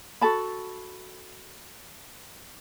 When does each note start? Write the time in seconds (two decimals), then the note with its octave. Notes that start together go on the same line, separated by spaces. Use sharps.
0.21 F#4 A4 A5 B5